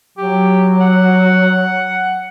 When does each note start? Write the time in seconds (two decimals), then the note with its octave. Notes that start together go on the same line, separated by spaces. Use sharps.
0.18 F#3 G4
0.81 F#5